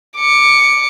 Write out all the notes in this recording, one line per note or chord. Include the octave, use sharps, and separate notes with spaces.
D6 C#7